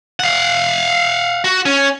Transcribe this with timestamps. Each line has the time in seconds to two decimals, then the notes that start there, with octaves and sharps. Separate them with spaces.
0.20 F5 F#5
1.44 F#4
1.66 C#4